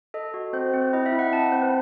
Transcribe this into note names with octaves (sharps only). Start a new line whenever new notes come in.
A4 D#5
F#4
C4 C5
C4
E4 D#5
E5
E4
F#5
C4 A5
C4 C5
B4